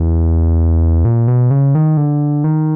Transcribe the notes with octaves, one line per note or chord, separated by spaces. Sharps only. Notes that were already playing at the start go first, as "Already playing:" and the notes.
Already playing: E2
A#2
B2
C#3
D#3
D3
D#3